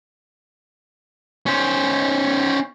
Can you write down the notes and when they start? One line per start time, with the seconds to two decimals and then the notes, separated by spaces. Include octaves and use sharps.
1.46 C#4 C5